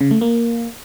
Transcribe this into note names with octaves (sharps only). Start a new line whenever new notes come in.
C#3
A3
A#3